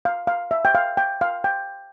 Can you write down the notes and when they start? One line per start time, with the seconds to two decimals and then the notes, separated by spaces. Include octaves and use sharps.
0.05 F5
0.27 F5
0.51 E5
0.65 G5
0.75 F5
0.97 G5
1.21 F5
1.44 G5